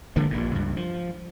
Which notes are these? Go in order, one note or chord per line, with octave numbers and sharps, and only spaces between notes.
D3 F3 G#3 A#3
A#1 G2 A#2
C#2 G2
F3